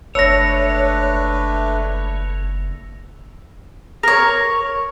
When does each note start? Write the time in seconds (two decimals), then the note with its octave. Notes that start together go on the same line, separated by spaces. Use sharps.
0.15 F#1 A3 D4 B4 C#5 E6 A#6
4.03 A#4 C#5